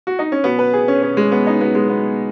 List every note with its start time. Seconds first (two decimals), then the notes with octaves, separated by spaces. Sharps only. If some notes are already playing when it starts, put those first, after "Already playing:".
0.07 F#4
0.19 D#4
0.32 C#4
0.44 B2 F#3 B3
0.59 B4
0.73 G#4
0.88 C#4
1.02 B2 F#3 C#4
1.17 G#3
1.32 B3
1.47 D#4
1.61 B2 F#3 B3
1.75 G#3
1.89 B3